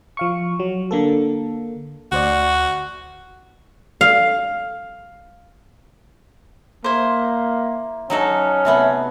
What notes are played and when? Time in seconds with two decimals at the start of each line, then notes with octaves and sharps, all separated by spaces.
0.17 F3 F5 C#6
0.60 F#3
0.91 D3 A#3 A4
2.12 D2 F#4 C5 D5
4.01 F5
6.84 A#3 E4 C5
8.10 F#3 C#4 D#4 A4
8.65 C3 A3 B3